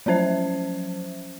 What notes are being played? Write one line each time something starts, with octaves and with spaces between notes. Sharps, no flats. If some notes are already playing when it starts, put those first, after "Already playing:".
F3 F#3 C#4 C5 E5